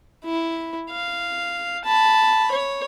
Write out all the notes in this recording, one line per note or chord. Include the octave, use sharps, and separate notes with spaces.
E4
F5
A5 B5
C#5